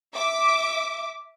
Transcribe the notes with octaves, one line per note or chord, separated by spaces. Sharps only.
E5 D6